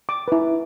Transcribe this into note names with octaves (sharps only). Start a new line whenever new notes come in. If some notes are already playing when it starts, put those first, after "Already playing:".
D6
E4 B4